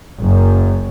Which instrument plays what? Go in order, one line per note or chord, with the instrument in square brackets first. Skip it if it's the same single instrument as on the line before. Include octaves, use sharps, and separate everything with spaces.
[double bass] F#1 F#2